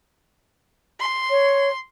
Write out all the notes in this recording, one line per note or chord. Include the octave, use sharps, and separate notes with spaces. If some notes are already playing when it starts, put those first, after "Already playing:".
C6
C#5